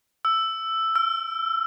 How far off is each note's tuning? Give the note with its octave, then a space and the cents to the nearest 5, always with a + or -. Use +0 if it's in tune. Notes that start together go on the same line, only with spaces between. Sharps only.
E6 +5
E6 +40